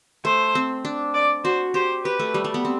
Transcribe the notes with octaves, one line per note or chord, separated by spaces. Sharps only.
A3 C5
C4
D4
D5
F#4 C5
G4 C5
G4 B4
A3
G3
G3
B3
C4